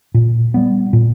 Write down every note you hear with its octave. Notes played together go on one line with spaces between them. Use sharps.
A#2
G3 B3
A#2